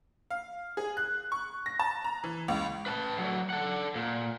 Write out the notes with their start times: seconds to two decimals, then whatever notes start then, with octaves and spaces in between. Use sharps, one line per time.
0.30 F5
0.77 G#4
0.97 F#6
1.32 C#6
1.66 A#6
1.79 A5
2.04 A#5
2.24 E3
2.48 C#2
2.86 B4 A5
3.18 D3 F#3
3.50 A4 F#5
3.95 A#2